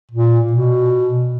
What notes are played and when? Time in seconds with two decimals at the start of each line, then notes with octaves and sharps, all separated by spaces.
0.12 A#2
0.52 B2